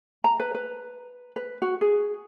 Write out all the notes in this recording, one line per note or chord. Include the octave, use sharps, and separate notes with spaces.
A#5
B4
B4
B4
F#4
G#4